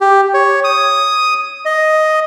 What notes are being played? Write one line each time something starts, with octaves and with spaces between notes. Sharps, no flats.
G4
C#5
D#6
D#5